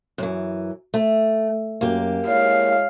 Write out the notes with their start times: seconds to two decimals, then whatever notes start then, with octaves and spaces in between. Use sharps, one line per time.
0.18 F#2 E3
0.94 A3
1.81 F#2 A#3 G4
2.27 G#3 E4 C#5 F5